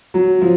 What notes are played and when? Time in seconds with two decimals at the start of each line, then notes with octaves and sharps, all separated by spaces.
0.14 F#3
0.41 F3